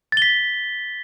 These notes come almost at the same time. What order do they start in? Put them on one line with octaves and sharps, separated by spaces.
A6 G7 B6